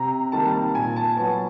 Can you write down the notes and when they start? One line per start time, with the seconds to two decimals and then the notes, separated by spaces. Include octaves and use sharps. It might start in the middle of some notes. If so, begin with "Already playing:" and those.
Already playing: C3 A#5
0.32 D#3 G3 A#3 A5
0.75 A#2 G#5
0.96 A5
1.17 F#3 B3 A5